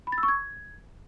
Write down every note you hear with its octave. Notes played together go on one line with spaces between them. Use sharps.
B5
A6
E6
C#6
G#6